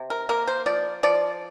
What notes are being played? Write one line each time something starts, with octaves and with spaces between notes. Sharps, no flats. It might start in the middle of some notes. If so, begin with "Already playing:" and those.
Already playing: C3
A#4
A#3 A#4
C5
F3 D5
F3 D5